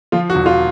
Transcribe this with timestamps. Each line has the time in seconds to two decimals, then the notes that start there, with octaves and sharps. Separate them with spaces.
0.12 F3 F4
0.30 F#4
0.35 E1
0.46 F4